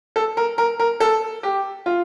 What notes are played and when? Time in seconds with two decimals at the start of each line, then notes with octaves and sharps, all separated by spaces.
0.16 A4
0.37 A#4
0.58 A#4
0.79 A#4
1.00 A4
1.43 G4
1.86 F4